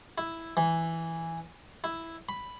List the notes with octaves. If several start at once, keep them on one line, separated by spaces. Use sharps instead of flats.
E4
E3
E4
B5